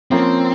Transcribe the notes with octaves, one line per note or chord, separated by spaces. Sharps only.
F3 A#3 C4 C#4